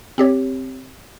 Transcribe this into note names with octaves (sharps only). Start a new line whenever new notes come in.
C4 G4 C#5